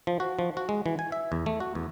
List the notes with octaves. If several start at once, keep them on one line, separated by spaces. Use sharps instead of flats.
F3
F#4
F3
F#4
G#3
E3
G#5
E5
E2
A3
F#4
E2